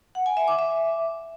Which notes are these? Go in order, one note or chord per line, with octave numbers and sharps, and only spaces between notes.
F#5
G#5
E5
D6
E5